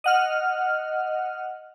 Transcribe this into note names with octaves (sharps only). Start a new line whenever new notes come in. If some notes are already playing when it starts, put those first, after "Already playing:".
D#5 F#5 F6